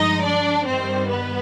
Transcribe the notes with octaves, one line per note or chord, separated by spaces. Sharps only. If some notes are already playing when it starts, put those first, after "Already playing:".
Already playing: G2 F3 G#3 D#4 D#5
D4 D5
G2 D#3 G3 C4 C5
B3 B4